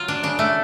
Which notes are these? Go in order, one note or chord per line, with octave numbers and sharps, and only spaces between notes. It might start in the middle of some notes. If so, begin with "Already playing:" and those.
Already playing: F#3 F4
D4
C#3 D4
A3